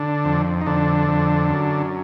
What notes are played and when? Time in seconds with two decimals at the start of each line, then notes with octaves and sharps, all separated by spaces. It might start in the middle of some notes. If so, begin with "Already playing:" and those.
Already playing: D3 D4
0.25 F2
0.61 D#4
0.66 F2 D3 D4
1.08 F2
1.49 F#2